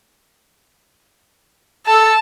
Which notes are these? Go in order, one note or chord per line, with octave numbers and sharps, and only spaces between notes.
A4 A5 E6